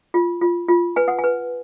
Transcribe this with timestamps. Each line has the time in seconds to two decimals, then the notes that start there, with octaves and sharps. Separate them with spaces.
0.14 F4
0.41 F4
0.69 F4
0.96 B4 G#5
1.08 F#5
1.19 G#5
1.24 B4